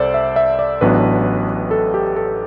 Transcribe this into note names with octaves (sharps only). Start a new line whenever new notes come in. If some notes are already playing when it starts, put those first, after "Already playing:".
Already playing: C2 A4 C5 D5
E5
E5
D5
A1 A2 F#3 B3 D4 B4
A4
G4
A4